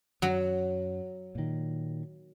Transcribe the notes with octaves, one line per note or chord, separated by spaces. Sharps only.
F#2 F#3
A#2 D#3